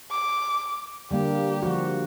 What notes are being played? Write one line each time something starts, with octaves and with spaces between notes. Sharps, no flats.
D6
D3 G3 A#3 G4
F3 F#4